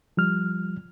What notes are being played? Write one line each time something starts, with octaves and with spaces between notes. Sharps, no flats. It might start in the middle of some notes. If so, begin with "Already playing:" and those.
F3 G3 F6